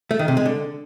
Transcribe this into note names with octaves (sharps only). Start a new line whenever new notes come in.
A3
D#3
C3
G#3
D3